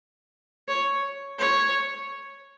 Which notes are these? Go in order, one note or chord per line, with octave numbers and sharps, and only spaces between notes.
C#5
C#5